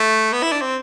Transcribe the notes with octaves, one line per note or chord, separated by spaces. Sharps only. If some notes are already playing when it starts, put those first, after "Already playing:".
Already playing: A3
B3
E4
D4
C4